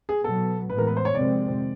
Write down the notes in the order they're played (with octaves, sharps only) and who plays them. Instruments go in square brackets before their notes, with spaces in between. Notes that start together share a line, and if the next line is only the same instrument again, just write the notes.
[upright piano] G#4
[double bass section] B2 F#3 B3 [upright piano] A4
[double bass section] A2 E3 G#3 B3 [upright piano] B4
[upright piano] A#4
B4
C5
C#5
[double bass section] F2 C3 D#3 G#3 C4 [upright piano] D5